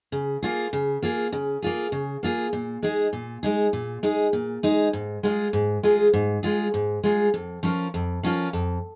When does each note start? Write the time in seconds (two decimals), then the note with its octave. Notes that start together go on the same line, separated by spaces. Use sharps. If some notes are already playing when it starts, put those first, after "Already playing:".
0.12 C#3
0.42 A#3 F4 G#4
0.73 C#3
1.02 A#3 F4 G#4
1.32 C#3
1.62 A#3 F4 G#4
1.92 C#3
2.23 A#3 F4 G#4
2.53 A#2
2.83 G#3 D#4 G#4
3.13 A#2
3.43 G#3 D#4 G#4
3.73 A#2
4.03 G#3 D#4 G#4
4.33 A#2
4.63 G#3 D#4 G#4
4.93 G#2
5.23 G#3 F4 G#4
5.53 G#2
5.83 G#3 F4 G#4
6.13 G#2
6.43 G#3 F4 G#4
6.74 G#2
7.03 G#3 F4 G#4
7.34 F2
7.63 F3 C#4 F4 A#4
7.94 F2
8.23 F3 C#4 F4 A#4
8.53 F2